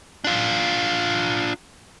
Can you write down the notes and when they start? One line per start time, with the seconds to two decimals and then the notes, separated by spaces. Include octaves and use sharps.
0.24 D4 F4